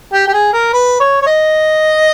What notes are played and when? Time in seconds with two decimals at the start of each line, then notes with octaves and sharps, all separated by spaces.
0.13 G4
0.28 G4
0.34 G#4
0.53 A#4
0.73 B4
1.00 C#5
1.22 C#5
1.27 D#5